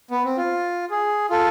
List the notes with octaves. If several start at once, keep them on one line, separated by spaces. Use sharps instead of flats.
B3
C4
F4
G#4
F4 A4